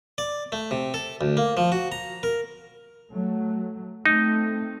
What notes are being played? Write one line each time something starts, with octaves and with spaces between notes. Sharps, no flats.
D5
A3
C3
A4
D2
A#3
F3
F#4
A#5
A#4
F#3 A3
A3 C4 D#4